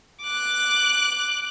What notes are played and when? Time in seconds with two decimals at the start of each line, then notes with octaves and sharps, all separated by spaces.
0.23 D6 F#6